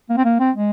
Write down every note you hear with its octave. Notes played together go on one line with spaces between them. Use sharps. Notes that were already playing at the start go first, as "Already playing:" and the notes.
A#3
C4
A#3
C4
G#3